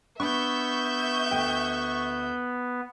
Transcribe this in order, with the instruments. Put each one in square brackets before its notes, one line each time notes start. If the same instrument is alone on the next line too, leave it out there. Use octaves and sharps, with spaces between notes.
[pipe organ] B3 B4 [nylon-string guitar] D4 [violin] E5 G6 [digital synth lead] C#6
[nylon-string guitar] D2 G5